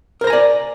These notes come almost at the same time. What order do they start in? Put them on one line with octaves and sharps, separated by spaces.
A#4 C5 A#5 G#5 D5